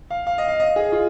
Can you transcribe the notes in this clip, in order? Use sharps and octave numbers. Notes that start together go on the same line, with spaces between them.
F5
F5
D#5
F5
D#5
G#4
F4